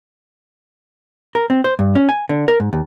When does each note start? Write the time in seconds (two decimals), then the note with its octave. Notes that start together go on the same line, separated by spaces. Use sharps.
1.35 A#4
1.50 C4
1.64 C5
1.79 G2
1.95 C#4
2.09 G#5
2.29 D3
2.48 A#4
2.60 G#2
2.73 D#2